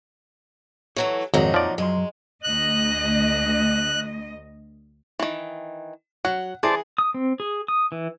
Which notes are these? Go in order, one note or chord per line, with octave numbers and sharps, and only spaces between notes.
E3 F#3 A3 C#5
G#1 F2 A#2 F#3 D#4
F3 D5
F#2 F#3 G#3 C6
D2 D#5 F#6
D#3 E3
F#3 F#5
E3 G#4 C5 D5 A5
D#6
C4
G#4
D#6
E3